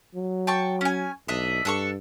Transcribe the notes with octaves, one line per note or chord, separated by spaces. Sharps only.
F#3
G5 A5 C#6
C#4 G#5
B1 D4 D#5 E5
G2 D4 A4 C#6